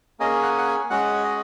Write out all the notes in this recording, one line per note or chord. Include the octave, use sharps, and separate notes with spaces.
A#3 C#4 G#4 D#5
F#5
F#5
G#5
G#3 C#4 F#4 F#5
D#5